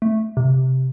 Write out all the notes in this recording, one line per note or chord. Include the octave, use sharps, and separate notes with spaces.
A3
C3